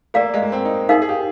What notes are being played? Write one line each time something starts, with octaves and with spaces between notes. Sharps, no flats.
A#3 A#4 D5 F5
G#3
A#3
C4
D#4
D#4 G#4 A#4 F5
G#4
G4